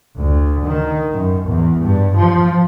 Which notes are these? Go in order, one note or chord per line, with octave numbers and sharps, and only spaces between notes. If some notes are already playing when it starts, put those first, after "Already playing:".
D2
D#3
F#2
E2
G2
F3